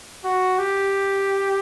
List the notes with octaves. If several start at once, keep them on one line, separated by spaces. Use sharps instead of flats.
F#4
G4